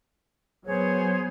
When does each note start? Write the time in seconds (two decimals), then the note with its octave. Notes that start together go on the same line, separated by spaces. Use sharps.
0.66 F#3 B3 G#4 C5 C#5